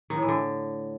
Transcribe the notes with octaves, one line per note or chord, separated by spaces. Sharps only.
D#3
A2
E3
D3